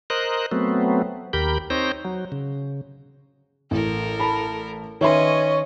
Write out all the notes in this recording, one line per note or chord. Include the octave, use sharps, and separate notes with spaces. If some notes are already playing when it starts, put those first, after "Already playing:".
A#4 C5 D#5 F#6
F#3 A3 B3 C4
D#2 G4 A#4 B5 G6
C4 D#4 C5 C#5 G5 A#6
F#3
C#3
A1 A4 A#4
A5 B5
D#3 C#4 B4 C#5 D#5 E5 C6